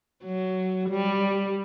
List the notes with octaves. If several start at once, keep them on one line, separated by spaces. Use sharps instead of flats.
F#3
G3